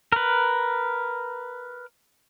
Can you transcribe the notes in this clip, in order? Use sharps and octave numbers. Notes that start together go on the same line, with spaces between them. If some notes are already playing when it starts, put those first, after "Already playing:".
A#4 B4